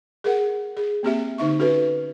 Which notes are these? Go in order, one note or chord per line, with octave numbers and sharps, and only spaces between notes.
G#4 A#4 F#5
G#4
A#3 C4 G4 E5
D3 D#4 E5 C#6
C#4 F#4 A4 B4